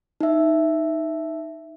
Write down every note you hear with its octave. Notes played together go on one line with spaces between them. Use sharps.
D#4 E5